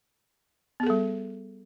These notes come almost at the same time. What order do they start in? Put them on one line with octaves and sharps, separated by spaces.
B3 G#4 A4 G3